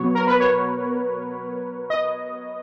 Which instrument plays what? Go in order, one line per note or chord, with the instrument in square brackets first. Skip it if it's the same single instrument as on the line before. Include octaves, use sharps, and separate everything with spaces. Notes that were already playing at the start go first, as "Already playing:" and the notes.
Already playing: [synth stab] B2 F#3 B3 C#5
A#4
B4
C#5
D#5